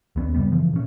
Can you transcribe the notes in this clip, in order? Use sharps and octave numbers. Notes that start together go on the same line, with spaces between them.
D#2 B3 C#4
F#2 C#3 G3 B3
C#3 E3 F3
A#2 C#4